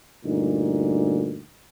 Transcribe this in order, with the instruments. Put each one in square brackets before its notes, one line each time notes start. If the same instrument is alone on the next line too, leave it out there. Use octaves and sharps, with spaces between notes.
[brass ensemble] D2 G2 A#2 D#4